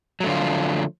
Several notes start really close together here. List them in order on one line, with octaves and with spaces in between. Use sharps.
F#3 A3 D3 F4 F3